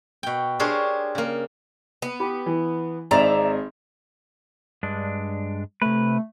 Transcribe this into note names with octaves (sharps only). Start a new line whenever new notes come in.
B2 G5
D4 G4 G#4 A#4 C5 C#5
C#3 A#3
B3
G4 B5
E3
G#1 C4 G#4 D5 E5 A#5
G2 G#3 D4
C3 A3 B4